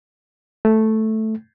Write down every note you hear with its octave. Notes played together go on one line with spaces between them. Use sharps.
A3